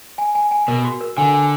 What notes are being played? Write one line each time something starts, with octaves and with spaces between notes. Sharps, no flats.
G#5
G#5
G#5
B2 A#4
F#4
A#4
D3 G#5
G#5